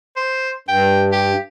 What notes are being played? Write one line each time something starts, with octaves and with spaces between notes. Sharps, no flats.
C5
G2 G5
G4